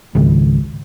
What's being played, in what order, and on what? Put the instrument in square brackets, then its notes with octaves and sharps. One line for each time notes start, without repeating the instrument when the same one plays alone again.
[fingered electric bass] G#1 C#2